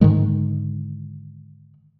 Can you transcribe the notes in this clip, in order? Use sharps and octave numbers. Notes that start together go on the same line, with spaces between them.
G#2 D3 D#3 G#3